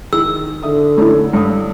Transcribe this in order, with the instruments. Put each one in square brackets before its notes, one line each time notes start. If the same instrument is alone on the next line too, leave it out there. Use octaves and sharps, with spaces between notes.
[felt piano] D#3 [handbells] E4 G#4 [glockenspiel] E6
[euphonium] D3 [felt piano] E5 D#6
[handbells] A3 E4 [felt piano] C#4 D#4 A4
[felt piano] G2 C#5 D#6